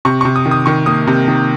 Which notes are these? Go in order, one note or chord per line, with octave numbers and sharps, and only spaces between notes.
C3 C#6
C3 C#6
D#6
D#3
D#6
D#3 C#6
A#3 D#6
C3
D#3